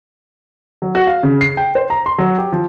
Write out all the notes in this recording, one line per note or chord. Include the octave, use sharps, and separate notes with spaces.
F#3
F#4
F5
C#3
C7
G5
C5
A#5
C6
F#3
G4
F3